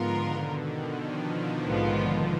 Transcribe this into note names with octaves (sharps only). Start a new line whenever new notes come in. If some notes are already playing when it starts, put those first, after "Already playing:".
Already playing: G#2 D3 F3 B3 F4 A#4
B2 D#3
B2 D#3
D3 F3
A#1 G#2 F3 B3 F4